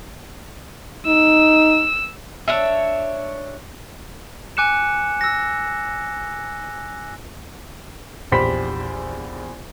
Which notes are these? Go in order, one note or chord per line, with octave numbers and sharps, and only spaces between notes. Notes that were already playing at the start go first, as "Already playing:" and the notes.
D#4 E6
D4 C#5 E5
G#5 D6 F#6 C#7 E7
E6 A#6
A#1 E2 G4 C5 B5 B6